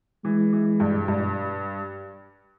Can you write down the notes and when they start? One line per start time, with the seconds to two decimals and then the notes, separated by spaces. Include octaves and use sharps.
0.24 E3 G#3
0.53 E3
0.80 G2
1.08 G2